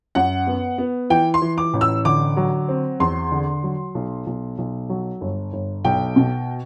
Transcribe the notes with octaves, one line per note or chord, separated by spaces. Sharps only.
F#2 F#5
B3
B3
E3 G5
C6
E3
D6
A1
E6
D3 D6
F#3
C4
E2 C6
D3
F#3
B1
B1
B1
F#3
G1
G1
B1 G5
B2